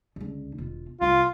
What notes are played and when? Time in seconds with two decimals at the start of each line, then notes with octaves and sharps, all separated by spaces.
0.16 C#2 D3
0.58 E1 F4
1.01 C2 F4